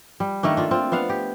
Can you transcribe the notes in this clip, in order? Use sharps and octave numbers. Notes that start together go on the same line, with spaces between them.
G3
D#3 A3 A#3 D4
D4 F4
C4 F4
B3 D4 F5 F#5
G4